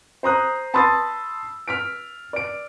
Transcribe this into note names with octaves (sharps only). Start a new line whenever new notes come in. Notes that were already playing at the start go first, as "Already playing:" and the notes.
C5 A#5 D#6 F#6
A5 B5 C6 D#6 E6 A6
F6 B6 D7
D5 D7